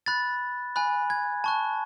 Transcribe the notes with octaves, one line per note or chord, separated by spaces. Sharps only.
B5 F#6 A6
G#5 B5 F#6
G#6
A5 C#6 F#6